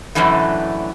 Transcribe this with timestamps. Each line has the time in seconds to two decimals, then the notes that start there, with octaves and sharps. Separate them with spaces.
0.15 F#2 A2 D3 E3 A3